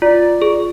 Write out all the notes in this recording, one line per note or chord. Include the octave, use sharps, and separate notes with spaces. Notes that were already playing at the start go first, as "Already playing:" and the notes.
F4 D5
G#4